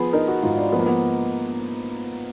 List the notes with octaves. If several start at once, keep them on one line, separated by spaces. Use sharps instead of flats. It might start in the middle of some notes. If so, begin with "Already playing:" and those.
Already playing: F3 B3 G#4
D#4 A#4
F#4
G#2 F4
D4
F3 B3
A#3
B3